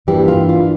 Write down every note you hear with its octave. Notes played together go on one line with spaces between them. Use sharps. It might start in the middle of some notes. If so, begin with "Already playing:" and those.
G2 E3 A#3 D4 G4
F4
F4